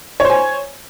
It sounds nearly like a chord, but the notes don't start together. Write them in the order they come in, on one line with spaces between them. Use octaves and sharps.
C#5 C5 G#5